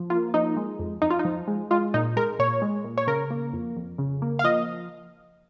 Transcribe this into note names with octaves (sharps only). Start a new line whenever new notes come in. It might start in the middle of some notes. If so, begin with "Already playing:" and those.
Already playing: F3
A#3 F4
F3 D#4
G#3
F2
F2 D#4
F4
D#4
F3
G#3
G#3 F4
A#2 D#4
G#3 A#4
A#2 C#5
G#3
A#2
C#5
C#3 A#4
A#3
F2
F2
C#3
A#3
F5
F3 D#5